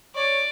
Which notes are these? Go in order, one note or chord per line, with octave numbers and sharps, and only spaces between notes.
C#5 D5